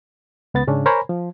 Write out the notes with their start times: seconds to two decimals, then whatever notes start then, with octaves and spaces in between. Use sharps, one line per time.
0.54 C#2 B3 A6
0.67 G#2 C#3 C#4 D4
0.86 A#4 C5 C#5 G#5 A#5 B5
1.09 F3